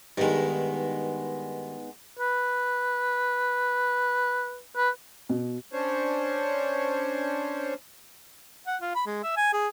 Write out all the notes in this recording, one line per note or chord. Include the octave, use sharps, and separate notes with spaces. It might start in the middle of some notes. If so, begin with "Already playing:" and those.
G2 D#3 G#3 B3 D#4
B4
B4
B2
C#4 D4 C5 C#5
F#5
F4
B5
G#3
E5
G#5
G#4